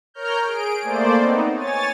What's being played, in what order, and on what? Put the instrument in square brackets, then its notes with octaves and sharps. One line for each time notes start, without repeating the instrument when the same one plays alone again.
[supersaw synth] A#4 C#5 A#5 F6 G6
G#4 D7
A3 A#3 C5 D5
B3 C4 D#4
C#5 G#5 A6